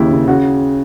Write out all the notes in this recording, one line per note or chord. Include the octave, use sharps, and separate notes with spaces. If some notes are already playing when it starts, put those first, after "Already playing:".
Already playing: D#2 C#3 E4
C#3
C#3 F#4